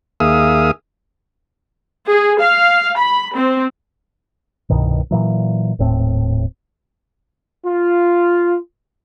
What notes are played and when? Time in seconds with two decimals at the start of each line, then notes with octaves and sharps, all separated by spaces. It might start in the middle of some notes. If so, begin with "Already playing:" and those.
0.20 D#2 A#3 G#4 E5 F5 D#6
2.07 G#4
2.41 F5
3.00 B5
3.36 C4
4.70 C2 G2 B2 D#3
5.11 A#2 E3 F#3
5.79 D#1 A2 C4
7.66 F4